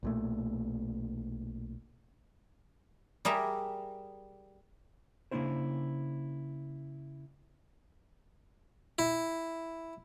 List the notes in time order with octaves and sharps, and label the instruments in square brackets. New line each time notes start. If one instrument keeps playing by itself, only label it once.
[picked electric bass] B1 A#2 A3
[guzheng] G3 G#4 A#4 E5
[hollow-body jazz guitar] C#3 G#3 A#3 D4 E4 C5
[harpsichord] E4